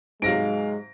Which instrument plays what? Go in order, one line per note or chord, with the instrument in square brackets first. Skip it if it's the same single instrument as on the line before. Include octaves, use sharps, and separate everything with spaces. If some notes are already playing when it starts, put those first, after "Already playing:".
[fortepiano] G#2 C3 F#3 [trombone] G#3 [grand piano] F5 A#6 D7